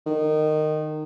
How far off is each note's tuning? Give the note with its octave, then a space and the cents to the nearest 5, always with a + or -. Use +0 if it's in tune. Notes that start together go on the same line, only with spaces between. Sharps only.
D#3 -20